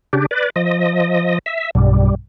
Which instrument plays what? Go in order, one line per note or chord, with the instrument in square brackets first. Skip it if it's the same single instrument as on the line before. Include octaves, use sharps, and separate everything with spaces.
[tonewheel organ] C#3 D4 G4
B4 D5
F3 D#5
E5
[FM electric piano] B1 G2 [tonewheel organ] G3